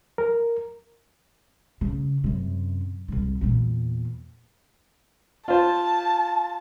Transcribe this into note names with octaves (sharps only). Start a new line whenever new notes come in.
A#4
C#3
F#2 C3
C2 G#2
E2 A#2
F4 C5 A5